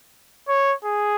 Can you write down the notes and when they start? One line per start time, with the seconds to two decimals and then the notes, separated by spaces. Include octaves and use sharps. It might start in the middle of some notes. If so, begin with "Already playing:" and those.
0.49 C#5
0.85 G#4